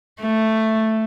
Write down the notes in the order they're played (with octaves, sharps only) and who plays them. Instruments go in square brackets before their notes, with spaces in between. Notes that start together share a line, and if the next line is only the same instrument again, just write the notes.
[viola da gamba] A3